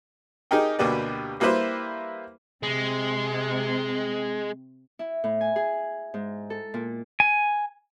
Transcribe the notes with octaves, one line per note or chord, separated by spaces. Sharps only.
D#4 G4 G#4 A#4 D#5 G5
D2 B2 A#3 G4 B4 D5
G3 A#3 E4 B4 C5 E5
C3 G#3 C4
E4
A2
G#5
G#4
G#2
A4
A#2
G#5